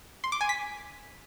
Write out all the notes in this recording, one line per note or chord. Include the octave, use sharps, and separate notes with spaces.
C6
D6
G#5
B6